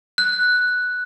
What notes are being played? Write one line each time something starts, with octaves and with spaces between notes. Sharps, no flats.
F#6